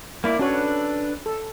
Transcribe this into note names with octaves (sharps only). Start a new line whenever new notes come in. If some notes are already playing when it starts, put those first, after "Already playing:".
A#3 E4 D5
C#4 D4 F#4 A4 B4 C#5
A4